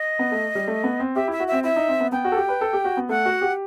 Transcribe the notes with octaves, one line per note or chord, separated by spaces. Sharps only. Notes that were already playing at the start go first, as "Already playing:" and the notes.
Already playing: D#5
B3
A3
G3
A3
B3
C4
G4 E5
E4 E5
F#4
C4 E5
E4 E5
D#4
C4
B3
B3 G5
F#4
A4
G4
B4
A4
G4
F#4
B3
A3 F#5
F#4
G4